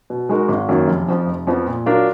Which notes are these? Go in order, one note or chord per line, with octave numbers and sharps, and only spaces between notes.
B2
G#3 D#4 F#4 A#4
G#1
F#2 D#3 F#3 A#3
F1
F2 F3
F1
F2 F3 B3
A#2
F#3 D4 F4 A#4